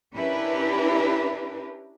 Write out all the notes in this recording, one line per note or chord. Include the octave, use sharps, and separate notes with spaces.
C#4 D4 E4 G4 A#4 B4